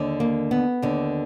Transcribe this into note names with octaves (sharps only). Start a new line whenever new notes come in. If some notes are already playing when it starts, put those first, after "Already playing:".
Already playing: D#2 D3
A#3
B3
D#2 D3